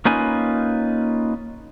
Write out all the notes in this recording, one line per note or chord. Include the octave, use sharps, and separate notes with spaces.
A#3 C#4 D#4 F4 B4 G#5